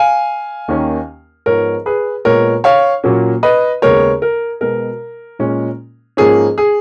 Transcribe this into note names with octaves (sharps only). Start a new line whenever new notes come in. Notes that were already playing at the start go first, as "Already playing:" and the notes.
Already playing: F5 G#5
D#2 D#3 A#3 C#4
G#2 F3 B3 A#4 C#5
G#4 B4
A#2 G#3 B3 A#4 C#5
C#5 F5
A#2 F#3 A#3 C#4
B4 D#5
D#2 C#3 G#3 B3 A#4 C#5
A#4
B2 G#3 B3 A#4
A#2 G#3 C#4
G#2 F3 A#3 C#4 G#4
G#4